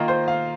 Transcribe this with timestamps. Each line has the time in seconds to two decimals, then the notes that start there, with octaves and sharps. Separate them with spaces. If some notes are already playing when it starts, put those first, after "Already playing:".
Already playing: D#3 A#3 F4 D#5
0.08 C5
0.28 F5